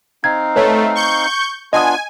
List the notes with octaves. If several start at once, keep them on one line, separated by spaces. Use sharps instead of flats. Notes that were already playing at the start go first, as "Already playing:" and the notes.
C4 D#4 F5 G#6
A3 B4 C#5
C#6 G6
B3 D4 F4 D#5 G#5 D#6